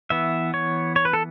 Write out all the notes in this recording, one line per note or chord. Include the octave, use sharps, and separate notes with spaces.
E3 B3 E5
C#5
C#5
B4
A4